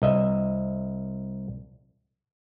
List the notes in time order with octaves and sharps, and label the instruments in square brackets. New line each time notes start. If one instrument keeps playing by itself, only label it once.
[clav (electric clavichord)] C2 D#5 E5